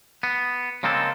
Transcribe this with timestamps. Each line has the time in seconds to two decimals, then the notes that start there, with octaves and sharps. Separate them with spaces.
0.23 B3
0.83 C#3 G#3 A#3 C4 A4